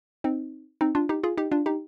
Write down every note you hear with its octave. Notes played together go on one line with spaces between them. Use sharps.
C4 D#4
C4 D#4
D4 F4
D#4 G4
F4 G#4
D#4 G4
D4 F4
D#4 G4